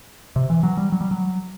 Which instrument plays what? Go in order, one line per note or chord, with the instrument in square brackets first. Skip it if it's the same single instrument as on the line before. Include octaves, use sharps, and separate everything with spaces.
[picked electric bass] C3
E3
F#3
G3
F#3
G3
F#3